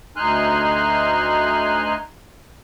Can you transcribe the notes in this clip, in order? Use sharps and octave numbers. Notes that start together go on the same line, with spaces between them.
D2 D#4 G#5 C6 F6 F#6